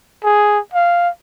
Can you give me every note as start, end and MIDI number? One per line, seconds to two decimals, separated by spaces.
0.24 0.59 68
0.74 1.09 77